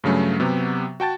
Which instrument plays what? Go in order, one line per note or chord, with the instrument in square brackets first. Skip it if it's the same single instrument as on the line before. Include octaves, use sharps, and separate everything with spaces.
[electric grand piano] G2 C#3 F#3 A3 C#4
C3 F#3 B3 G4
F#4 G5 A5 A6